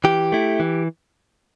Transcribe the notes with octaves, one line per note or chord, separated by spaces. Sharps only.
E3 G4
A3 E4
E3